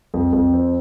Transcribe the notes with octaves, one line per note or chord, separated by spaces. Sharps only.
F2
F2
C4